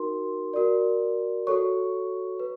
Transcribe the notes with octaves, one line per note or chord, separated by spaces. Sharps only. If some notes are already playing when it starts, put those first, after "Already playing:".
Already playing: D#4 F#4 A#4 C6
F#4 A#4 D5
F#4 A4 C#5 C#6
B4